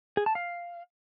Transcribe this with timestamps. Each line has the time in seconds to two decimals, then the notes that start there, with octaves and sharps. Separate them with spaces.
0.17 G#4
0.26 A5
0.35 F5